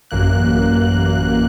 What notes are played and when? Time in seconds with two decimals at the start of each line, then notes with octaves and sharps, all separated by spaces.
0.11 A1 F#2 A#3 F#6